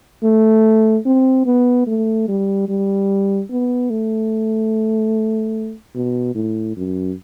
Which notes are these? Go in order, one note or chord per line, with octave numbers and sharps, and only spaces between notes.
A3
C4
B3
A3
G3
G3
B3
A3
B2
A2
F#2